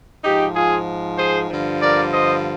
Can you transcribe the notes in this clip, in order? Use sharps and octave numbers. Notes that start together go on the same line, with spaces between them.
G#2 F3 D#4 G4
F4 G#4
G#4 C5
G2 D3 F3
A#4 D5
C5 D#5